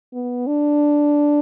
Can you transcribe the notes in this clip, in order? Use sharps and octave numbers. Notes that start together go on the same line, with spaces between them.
B3
D4